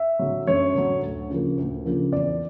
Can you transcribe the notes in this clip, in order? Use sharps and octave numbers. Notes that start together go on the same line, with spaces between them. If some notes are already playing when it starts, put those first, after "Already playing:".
Already playing: E5
D3 F#3
F#2 C#5
D3 F#3
D2
C#3 F3 A#3
D2
C#3 F3 A#3
E2 D5